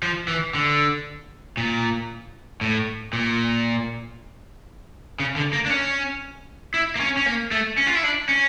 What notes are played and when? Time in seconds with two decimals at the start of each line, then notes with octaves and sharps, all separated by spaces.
0.02 F3
0.28 E3
0.54 D3
1.57 A#2
2.61 A2
3.13 A#2
5.20 C#3
5.36 D3
5.53 A#3
5.66 D4
5.70 C#4
6.74 E4
6.95 A#3
7.00 C#4
7.17 C#4
7.26 A#3
7.51 A3
7.77 C#4
7.87 F4
7.95 E4
8.03 D4
8.29 C#4